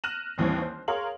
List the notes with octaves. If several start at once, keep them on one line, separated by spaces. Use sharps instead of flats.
F6 F#6 A#6 D#7 E7 F#7
A1 D#2 E3 G3 C4 C#5
C5
G#4 A#4 C#5 F5 C6 F#7